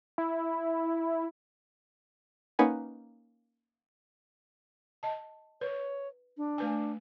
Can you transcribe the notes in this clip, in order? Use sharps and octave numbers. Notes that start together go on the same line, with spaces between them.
E4
A#3 C#4 D#4 B4 F#5 G#5
D#5 A5
B4 C#5
D4
A3 B4 G#5